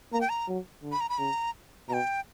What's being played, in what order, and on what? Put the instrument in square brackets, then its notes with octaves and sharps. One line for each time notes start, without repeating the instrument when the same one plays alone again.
[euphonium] A#3 [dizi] A#5
[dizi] G5
A#5
[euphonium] F#3
D3
[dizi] B5
A#5
B5
[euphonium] C#3 [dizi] A#5
[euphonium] B2 [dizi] G5 A#5